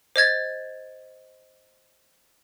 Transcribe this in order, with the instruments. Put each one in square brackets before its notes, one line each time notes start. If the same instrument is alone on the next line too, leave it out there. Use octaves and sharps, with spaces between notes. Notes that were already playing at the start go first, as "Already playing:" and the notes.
[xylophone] C5 D#5 G#6 A6